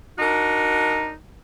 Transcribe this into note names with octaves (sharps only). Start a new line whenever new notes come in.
D4 D#4 F#4 A#4